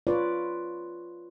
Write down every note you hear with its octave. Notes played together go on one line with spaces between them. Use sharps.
F4 B4 C#5 D5